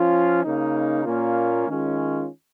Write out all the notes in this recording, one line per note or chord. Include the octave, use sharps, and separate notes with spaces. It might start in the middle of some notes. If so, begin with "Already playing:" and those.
Already playing: F3 C#4 F4
C#3 A#3 D#4
A#2 A#3 C#4 F4
D#3 G#3 C#4 F4